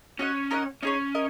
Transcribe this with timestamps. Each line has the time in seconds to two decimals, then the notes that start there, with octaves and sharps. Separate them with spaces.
0.19 C#4 F#4 D#5 F#5
0.51 D#4 A#4 D#5 F#5
0.83 C#4 D#4 G#4 C#5
1.15 A#4 D#5